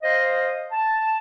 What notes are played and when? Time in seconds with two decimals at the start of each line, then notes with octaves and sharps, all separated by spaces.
0.03 C5 D#5 F5
0.72 A5